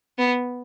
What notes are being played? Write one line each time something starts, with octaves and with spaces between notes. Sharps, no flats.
B3